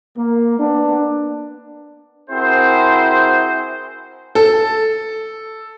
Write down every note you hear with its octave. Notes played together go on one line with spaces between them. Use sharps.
A#3
B3 D4
C4 E4 F#4 G#4 A#4 C5
A4